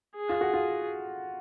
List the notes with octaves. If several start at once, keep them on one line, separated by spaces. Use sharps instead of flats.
G#4
F4
F#4
F4